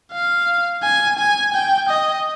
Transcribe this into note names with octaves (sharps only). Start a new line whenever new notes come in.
F5
G#5
G#5
G5
D#5